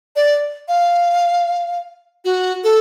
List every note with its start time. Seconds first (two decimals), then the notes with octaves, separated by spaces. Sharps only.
0.16 D5
0.68 F5
2.25 F#4
2.64 A4